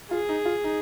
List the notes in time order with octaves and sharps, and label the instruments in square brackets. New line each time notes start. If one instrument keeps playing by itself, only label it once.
[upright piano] F4 [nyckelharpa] G#4
[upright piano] D#4
F4
D#4